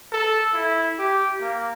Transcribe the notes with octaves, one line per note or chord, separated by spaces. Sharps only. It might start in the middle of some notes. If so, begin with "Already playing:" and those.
A4
E4
G4
A#3